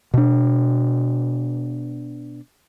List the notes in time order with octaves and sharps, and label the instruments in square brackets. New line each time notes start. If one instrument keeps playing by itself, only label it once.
[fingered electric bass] B2 D4